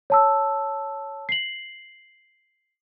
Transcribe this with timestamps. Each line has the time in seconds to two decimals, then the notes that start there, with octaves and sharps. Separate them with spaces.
0.10 C#5 A5 E6
1.29 C7 F#7